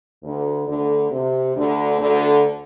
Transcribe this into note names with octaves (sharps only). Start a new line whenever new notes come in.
D2 D3
D2 D3
C3
D2 D3
D2 D3